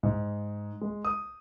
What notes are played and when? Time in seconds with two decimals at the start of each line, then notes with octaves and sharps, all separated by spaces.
0.03 G#2
0.81 G#3
1.05 D#6